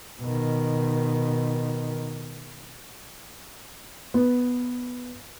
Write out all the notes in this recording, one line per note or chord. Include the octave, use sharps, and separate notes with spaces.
B2 D#3
B3